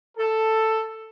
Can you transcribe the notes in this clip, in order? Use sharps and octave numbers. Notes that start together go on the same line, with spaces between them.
A4